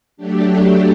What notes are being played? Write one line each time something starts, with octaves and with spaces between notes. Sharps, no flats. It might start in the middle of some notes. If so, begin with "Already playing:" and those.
F#3 A3 D4 G4